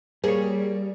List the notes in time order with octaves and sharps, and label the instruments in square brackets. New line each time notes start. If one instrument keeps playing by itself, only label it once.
[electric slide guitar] G3 [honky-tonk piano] A#3 [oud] G#4 C#5